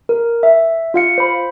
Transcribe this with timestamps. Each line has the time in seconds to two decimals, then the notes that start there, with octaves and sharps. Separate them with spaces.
0.09 A#4
0.43 E5
0.94 F4 F5 C#7
1.18 C5 B5